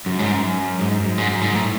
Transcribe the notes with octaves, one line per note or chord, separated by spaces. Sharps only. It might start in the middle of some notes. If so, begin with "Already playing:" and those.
F#2
G#2
F#2
G#2
F#2
G#2
F#2
G#2
A2